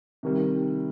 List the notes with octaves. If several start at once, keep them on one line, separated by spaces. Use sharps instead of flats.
C3 D#3 G3